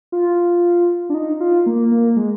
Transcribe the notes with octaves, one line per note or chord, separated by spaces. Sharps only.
F4
D4
D#4
F4
A#3
A#3
G#3